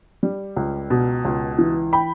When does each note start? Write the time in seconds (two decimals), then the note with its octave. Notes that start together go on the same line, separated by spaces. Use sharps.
0.23 G3
0.56 C#2
0.90 B2
1.25 C#2
1.58 E3
1.93 G5 B5